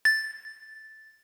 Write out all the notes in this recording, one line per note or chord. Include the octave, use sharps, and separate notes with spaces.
A6